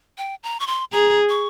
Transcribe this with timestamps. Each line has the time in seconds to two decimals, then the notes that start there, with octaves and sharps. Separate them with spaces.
0.18 G5
0.43 A#5
0.60 C#6
0.67 C6
0.92 G#4 A#5
1.29 C#6